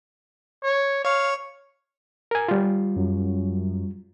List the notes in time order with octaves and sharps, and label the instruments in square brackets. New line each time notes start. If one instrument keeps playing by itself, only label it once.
[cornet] C#5
[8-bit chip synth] C#5 C#6 [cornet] F5
[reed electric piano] A#4 G#5
G3 F4
[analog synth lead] F#2